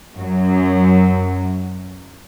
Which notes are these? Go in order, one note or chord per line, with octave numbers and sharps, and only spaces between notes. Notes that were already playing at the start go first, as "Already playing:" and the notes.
F#2 F#3